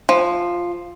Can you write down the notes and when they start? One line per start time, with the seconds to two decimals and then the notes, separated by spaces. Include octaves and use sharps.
0.09 F3